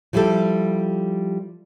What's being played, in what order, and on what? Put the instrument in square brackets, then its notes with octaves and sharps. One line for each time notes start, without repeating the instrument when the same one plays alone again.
[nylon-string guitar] F3 G3 E4 G4 A4